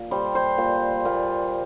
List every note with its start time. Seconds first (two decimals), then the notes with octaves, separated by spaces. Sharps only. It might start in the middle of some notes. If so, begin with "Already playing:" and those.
Already playing: A#2
0.11 G3 C5
0.35 C5
0.58 A#2
1.05 A#2